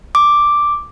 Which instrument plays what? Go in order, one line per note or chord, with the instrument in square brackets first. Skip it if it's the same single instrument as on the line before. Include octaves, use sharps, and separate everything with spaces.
[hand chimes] D6